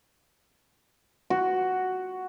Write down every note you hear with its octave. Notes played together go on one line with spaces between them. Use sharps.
F#4